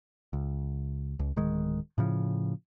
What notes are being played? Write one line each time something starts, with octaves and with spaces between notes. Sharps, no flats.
C#2
C#2
D1 D#3 G#3
A2 C#3 F3